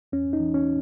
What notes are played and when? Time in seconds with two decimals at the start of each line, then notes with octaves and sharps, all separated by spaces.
0.12 E2 C#4
0.33 D#4
0.40 E3
0.54 C#4